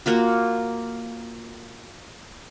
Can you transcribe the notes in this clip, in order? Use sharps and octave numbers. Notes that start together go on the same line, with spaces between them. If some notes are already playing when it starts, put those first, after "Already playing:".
A#3 F4 F#4